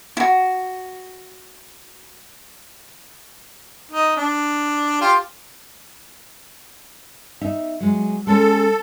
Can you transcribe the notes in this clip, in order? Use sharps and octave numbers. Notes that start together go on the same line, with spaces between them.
E4 F#4
D#4
D4
F4 G4
D#4 E5
F#3 G#3
G#3 C#4 A4 C#5